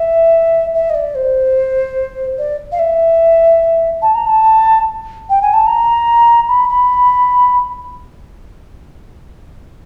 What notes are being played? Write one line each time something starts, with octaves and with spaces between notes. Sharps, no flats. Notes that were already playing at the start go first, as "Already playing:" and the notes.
Already playing: E5
E5
D#5
D5
C5
D5
F5
E5
A5
A#5
A5
G5
G#5
A5
A#5
B5
B5